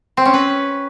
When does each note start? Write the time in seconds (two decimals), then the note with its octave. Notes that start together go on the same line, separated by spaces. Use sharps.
0.17 C4
0.25 C#4
0.34 B4